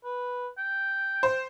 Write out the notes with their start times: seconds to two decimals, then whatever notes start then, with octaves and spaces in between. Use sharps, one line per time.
0.04 B4
0.58 G5
1.23 C5